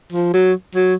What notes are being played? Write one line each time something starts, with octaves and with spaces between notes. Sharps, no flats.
F3
F#3
F#3